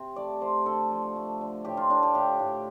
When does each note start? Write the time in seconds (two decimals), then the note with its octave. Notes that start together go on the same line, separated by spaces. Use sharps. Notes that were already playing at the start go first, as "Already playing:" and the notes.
Already playing: C3
0.16 A3 D5
0.42 A3 C5
0.66 D3 A4
0.90 F3
1.16 A3
1.41 D3
1.65 A2 G4
1.77 F4
1.90 A2 D4
2.03 G4
2.14 A2 G4
2.39 A2